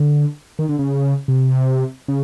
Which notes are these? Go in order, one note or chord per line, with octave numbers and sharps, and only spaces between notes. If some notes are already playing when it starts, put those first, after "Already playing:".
Already playing: D3
D#3
D3
C#3
C3
C#3